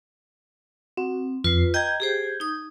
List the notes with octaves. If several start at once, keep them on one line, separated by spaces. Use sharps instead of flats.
C4 F#4
F2 F4 B4 C7
D#5 G5 A#5 G6 G#6
G4 G#4 C5
D#4 D#6